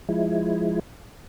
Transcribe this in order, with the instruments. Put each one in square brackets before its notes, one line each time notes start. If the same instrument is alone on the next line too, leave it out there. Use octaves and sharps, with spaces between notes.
[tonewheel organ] F3 G#3 E4